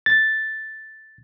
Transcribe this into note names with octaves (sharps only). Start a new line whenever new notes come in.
A6